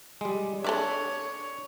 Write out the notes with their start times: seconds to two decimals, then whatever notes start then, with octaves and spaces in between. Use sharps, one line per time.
0.21 G3 G#3
0.64 D4 A4 C#5 D5 E5